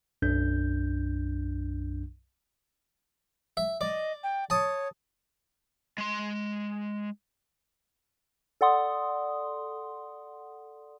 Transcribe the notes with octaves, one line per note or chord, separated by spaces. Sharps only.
B1 F#2 D4 G6
E5
D5 D#5
G5
C#5 A5 D#6
G#3 C6
A4 D5 F#5 C6 D#6